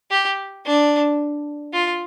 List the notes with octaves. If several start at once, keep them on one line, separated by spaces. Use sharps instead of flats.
G4
D4
F4